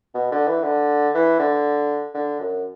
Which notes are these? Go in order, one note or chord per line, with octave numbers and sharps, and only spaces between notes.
B2
D3
E3
D3
E3
D3
D3
F#2